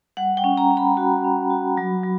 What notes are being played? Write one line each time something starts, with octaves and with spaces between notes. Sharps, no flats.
G3 F#5
G5
C#4
A#5
C#4
B5
F#4
C#4
F#4
F#3
F#3